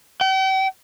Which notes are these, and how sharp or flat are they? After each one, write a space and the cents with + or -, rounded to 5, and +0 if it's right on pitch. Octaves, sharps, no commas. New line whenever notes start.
G5 -45